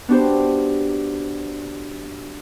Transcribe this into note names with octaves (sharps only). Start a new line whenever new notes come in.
B3 D4 F#4 G4 C5